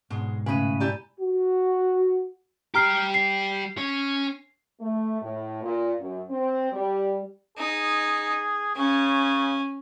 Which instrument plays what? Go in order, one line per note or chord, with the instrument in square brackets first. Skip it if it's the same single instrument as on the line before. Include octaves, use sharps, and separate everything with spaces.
[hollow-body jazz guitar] G#2 B2 [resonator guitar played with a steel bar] G#3
[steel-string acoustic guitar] A2 C#3 [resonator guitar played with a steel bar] B4 [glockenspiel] G#5 B5 D#7
[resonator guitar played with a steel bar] E4 G4 D5 [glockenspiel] A#5
[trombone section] F#4
[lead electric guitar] G3 G4 [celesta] A#5 F6 C7
[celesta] C7
[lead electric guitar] C#4 C#5
[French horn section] A3
A2
A#2
F#2
C4
G3
[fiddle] D#4 [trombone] G#4
[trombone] C#3 [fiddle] C#4